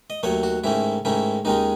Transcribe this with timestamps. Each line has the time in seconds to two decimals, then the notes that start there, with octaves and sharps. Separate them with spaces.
0.10 D#5
0.23 D#2 D#3 F#3 A3 C#5
0.43 F#4
0.64 G#2 D#3 A3 C#4 E4
1.05 G#2 D#3 A3 C#4 E4
1.45 D#2 D#3 G#3 C#4 D#4